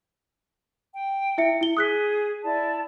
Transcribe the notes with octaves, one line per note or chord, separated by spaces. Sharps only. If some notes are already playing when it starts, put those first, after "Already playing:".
G5
E4 E5 C#7
E4 G7
G#4 D#6 F#6 B6
E4 D5 A5